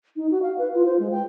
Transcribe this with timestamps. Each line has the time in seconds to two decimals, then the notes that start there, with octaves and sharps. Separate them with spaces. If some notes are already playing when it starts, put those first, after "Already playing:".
0.16 D#4
0.31 F#4
0.42 F5
0.58 B4
0.74 F4
0.86 C5
0.99 G#3
1.12 G5